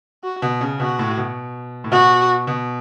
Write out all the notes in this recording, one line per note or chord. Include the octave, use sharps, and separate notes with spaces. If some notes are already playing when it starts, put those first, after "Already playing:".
F#4
B2
C#3
B2 F#4
A2
B2
A2
B2 F#4
B2